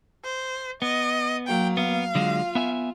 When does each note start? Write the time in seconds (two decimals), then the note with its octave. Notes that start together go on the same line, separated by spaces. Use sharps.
0.24 C5
0.82 B3 D#5
1.47 F#3 A#3 G5
1.77 B3 F5
2.15 D3 F#3 G#3 F4
2.55 B3 E5 G#5